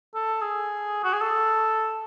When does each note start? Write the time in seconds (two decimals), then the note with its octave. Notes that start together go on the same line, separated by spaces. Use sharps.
0.15 A4
0.41 G#4
1.04 F#4
1.13 G#4
1.21 A4